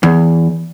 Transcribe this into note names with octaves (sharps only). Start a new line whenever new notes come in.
E2